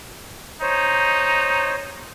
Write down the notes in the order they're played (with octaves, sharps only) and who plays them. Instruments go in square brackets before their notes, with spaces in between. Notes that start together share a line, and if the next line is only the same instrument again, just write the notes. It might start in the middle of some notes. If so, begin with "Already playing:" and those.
[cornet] D#4 [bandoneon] C5 C#5